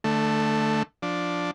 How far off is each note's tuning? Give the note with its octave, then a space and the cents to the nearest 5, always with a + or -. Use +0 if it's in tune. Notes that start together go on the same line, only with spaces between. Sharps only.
D3 +25 A3 +0
F3 +15 D4 +0